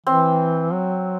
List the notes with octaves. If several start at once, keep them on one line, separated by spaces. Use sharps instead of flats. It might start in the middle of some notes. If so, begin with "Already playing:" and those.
E3 C4
F#3